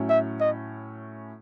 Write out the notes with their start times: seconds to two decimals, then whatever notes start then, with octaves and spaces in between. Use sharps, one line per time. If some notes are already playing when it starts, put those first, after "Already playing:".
Already playing: A2 F#3 C#4 E4
0.09 E5
0.40 D#5